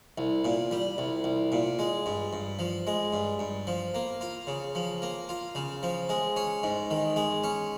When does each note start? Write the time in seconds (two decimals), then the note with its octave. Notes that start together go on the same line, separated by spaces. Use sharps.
0.18 C2
0.45 A#2
0.71 G3
0.98 C2
1.24 C2
1.52 A#2
1.79 G#3
2.06 G2
2.33 G2
2.59 F3
2.87 G#3
3.13 G2
3.39 G2
3.67 F3
3.94 A#3
4.21 F4
4.47 C#3
4.75 F3
5.02 A#3
5.29 F4
5.55 C#3
5.83 F3
6.09 G#3
6.36 C#4
6.63 G#2
6.91 D#3
7.16 G#3
7.44 C#4